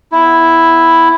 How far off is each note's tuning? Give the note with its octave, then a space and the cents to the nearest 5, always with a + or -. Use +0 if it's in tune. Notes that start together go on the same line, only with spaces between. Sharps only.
B3 +0 E4 +0